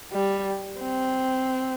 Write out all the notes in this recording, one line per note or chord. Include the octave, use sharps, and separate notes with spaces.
G3
C4